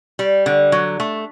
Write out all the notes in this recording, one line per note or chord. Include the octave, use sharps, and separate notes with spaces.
G3
D3
F#3
A3